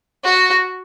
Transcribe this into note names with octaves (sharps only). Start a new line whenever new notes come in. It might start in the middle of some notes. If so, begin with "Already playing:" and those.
F#4